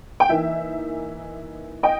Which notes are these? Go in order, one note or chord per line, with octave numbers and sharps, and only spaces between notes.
G5
E3 A#3 D#4 E5
D#5 G5